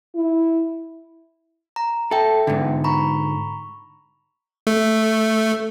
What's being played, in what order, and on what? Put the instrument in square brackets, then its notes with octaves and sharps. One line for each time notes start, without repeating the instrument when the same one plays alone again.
[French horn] E4
[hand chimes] A#5
[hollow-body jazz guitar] A4 [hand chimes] E5 G5
[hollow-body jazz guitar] G#2 D3
[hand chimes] A#5 B5 C#6
[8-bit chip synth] A3